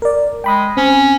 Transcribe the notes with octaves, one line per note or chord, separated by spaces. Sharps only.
A#4 D5
G#3 G5 B5 D#6
C4 C#4